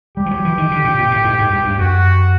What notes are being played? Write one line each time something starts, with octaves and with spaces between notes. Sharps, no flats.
G3 G4
F3
F#3
E3
D#3
D3
A#2
A#2
A2
G#2
G#2
G2
G2
F#2 F#4